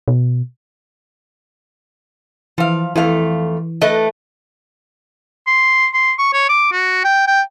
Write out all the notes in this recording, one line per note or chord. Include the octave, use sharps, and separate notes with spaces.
B2
E3 F3 F5
F2 E3 A3 F5
A3 B4 D#5
C6
C6
C#6
C#5
D6
F#4
G5
G5